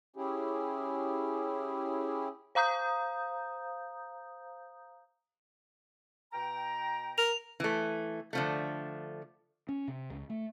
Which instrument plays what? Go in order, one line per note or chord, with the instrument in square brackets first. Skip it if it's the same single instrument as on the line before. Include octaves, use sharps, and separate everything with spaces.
[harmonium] C#4 E4 G4 G#4
[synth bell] C5 F5 A#5 D#6 G6
[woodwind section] B2 G5 A#5
[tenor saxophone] A#4 [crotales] F7
[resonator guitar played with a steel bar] E3 A3
D3 F3 A3
[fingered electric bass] C#4
C3
C#2
A3